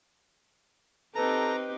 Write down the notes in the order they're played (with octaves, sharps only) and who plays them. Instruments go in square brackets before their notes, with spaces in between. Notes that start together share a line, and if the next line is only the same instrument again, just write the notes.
[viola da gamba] C4 D#4 G4 [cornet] A4 [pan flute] B4 [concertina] A#5